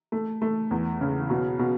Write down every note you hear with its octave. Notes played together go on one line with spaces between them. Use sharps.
A3
A3
E2
C#3
B2
B2